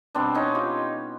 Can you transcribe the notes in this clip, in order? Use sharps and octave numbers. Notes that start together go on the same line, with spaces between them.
B2 G3 C4 D4
C#4 D#4
F4 G4